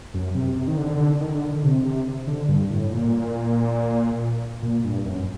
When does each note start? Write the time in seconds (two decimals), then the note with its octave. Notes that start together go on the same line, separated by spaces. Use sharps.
0.14 F#2
0.34 C3
0.56 C3
0.68 D#3
0.77 D3
1.21 D#3
1.34 D3
1.48 D3
1.63 C3
1.85 C3
2.27 D3
2.48 G2
2.70 A2
2.92 A#2
4.62 A#2
4.84 G2
5.05 F#2